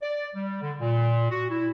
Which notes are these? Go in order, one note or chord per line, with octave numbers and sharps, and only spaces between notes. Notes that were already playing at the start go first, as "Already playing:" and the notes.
D5
G3
D3
A#2
F#4
E4